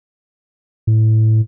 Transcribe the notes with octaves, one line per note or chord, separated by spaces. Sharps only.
A2